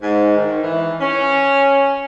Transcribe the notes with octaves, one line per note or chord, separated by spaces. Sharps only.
G#2
D#3
E3
C#4